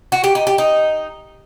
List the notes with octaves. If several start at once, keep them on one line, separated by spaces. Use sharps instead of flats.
F#4
G4
D#4
G4
D#4